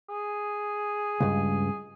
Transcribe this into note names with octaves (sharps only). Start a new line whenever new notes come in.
G#4
C#2 G2